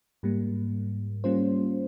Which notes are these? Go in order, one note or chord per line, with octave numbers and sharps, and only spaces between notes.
G#2 G3 A#3
G3 A#3 C#4 F4 C5